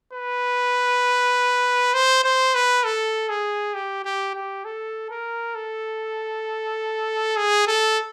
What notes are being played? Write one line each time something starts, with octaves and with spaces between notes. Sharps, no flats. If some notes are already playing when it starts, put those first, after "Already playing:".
B4
C5
C5
B4
A4
G#4
G4
G4
G4
A4
A#4
A4
G#4
A4